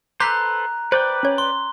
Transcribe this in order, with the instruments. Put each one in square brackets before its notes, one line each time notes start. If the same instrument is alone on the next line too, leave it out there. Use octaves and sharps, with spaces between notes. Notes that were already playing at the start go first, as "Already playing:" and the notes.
[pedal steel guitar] A4 B4 C5 [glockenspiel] A#5 F#6 [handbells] D6 B6
[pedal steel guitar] B4 D5 G5 [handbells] C5
[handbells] C#4 C#5
[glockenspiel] C6